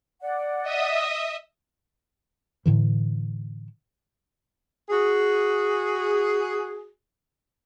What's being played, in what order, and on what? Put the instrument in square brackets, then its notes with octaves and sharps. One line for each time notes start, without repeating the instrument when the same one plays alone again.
[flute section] D5 F#5
[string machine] D#5 E5 D#6
[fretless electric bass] A2 D3 E3
[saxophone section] F#4 G#4